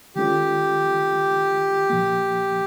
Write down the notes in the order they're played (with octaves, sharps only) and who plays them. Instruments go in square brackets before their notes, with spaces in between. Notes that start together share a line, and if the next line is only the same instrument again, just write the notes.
[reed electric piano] D#3 G#3 C#4 F4 A4 [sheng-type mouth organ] G4
[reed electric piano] A#2 F3 A#3